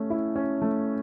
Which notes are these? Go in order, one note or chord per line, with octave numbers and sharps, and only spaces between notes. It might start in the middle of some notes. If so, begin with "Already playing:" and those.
Already playing: A3 C#4
E4
C#4
A3